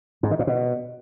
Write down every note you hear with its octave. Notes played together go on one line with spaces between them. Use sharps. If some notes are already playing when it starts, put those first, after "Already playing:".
G#2
D#3
A#2
B2